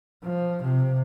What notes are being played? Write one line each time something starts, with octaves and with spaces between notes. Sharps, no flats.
F3
C3